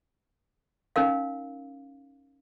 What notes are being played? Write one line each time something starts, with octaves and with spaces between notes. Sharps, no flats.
C#4 D#4 A#4 F5